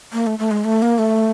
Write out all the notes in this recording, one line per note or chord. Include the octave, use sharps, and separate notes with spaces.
A#3
A3
A3
G#3
A3
A#3
A3